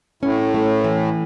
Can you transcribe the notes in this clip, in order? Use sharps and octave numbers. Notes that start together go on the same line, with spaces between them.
A2 C#4
A3
E3